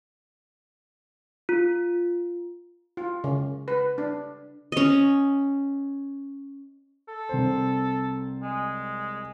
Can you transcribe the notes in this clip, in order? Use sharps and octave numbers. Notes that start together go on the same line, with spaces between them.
F4
F4
C#3
B4
D4
C#4 D#5
A4
C2 C4 C5
G#3